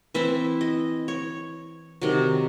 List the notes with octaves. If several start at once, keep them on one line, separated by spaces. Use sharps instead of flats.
E3 C4 E4 E5
D#5
C#5
C3 D#3 F#3